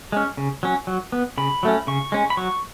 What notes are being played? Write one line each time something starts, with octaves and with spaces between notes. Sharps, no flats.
G#3 C#4
C#3
F#3 C#4
F#3
B3
C#3 B5
F#3 A3 C#4
C#3 C#6
G#3 C#4
B5
F#3 C#6